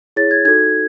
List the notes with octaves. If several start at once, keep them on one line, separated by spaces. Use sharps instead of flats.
E4 G#4 C#5 A6
G#6
D#4 F#4 A4 G#6